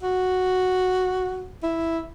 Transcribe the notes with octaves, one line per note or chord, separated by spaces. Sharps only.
F#4
E4